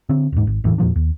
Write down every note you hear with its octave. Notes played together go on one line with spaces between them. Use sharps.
D3 C4
D#1 G#2
G#1
F#1 E2 A2 E3
E2 A#2 F3 D4
D#2